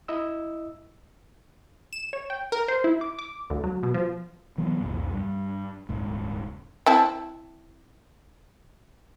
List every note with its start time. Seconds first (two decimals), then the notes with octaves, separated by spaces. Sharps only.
0.08 E4 D#5 E6
1.93 E7
2.13 C#5
2.30 G5
2.52 A#4
2.68 C5
2.84 E4
3.01 D6
3.19 D6
3.50 D2
3.64 F#3
3.83 B2
3.94 F3
4.58 E3 F#3 B3
4.81 C2 F2 A#2
5.10 G2
5.89 D#1 C#2 G#2
6.86 C4 E4 A5